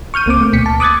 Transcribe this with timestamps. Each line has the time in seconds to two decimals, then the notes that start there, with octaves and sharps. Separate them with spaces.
0.14 C#6 F6 G6 D#7
0.26 C#2 A#3 C4 D6
0.41 A3
0.53 D2 B2 B6 C#7
0.66 A5
0.80 D6 D#6 F#6 G#6 A6